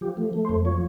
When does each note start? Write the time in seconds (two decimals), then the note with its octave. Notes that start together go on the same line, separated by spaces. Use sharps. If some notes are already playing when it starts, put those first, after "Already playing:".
0.01 F3 G4
0.17 A3
0.33 A3
0.45 C5
0.49 F2
0.65 F3 C#5